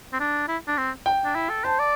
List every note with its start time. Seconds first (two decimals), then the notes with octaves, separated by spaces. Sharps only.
0.13 C4
0.20 D4
0.48 E4
0.68 D4
0.78 C4
1.06 G5
1.24 D4
1.35 E4
1.50 A4
1.64 C5 A5
1.79 D5